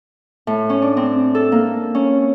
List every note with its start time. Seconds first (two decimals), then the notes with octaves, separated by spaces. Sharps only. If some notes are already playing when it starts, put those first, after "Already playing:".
0.47 A2
0.70 C#4
0.82 D4
0.97 C4
1.35 A4
1.52 A#3
1.95 C#4